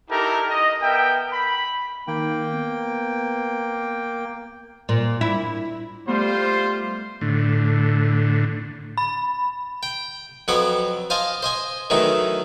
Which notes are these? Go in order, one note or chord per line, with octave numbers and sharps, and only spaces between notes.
D#4 E4 G4 A4 A#4
D#5
B3 A#4 E5 G5
B5
D#3 A#3 G5
B3
A#2
E4
G3 A3 B3 F4 C5
A2 D3
B5
G5
F2 F#3 B3 C#5 D6
C5 D#5 F5 G#5 A5
C5 D#5 G#5
D#3 E3 F#3 A3 D#4